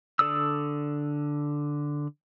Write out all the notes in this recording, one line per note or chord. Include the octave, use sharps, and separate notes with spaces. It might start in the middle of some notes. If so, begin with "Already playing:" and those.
D3 A4 D5 D#6 E6